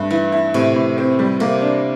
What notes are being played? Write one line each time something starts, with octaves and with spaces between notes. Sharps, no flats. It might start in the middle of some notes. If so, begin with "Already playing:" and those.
Already playing: G2 A3
E3 E4
E4
A2 C3
A2
C4
G3
C3 A#3
D4